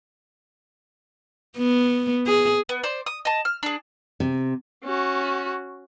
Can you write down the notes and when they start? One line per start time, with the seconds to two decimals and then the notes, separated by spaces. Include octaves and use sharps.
1.57 B3
2.27 G#4
2.69 B3
2.83 C5 D5
3.06 D#6
3.25 D#5 A5
3.45 F6
3.63 D4 G#4
4.20 C3
4.84 C#4 F#4